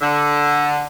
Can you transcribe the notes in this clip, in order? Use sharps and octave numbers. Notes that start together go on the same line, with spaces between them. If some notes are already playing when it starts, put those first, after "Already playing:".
D3